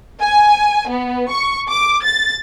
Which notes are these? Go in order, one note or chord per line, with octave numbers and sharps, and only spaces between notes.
G#5
B3
C#6
D6
A6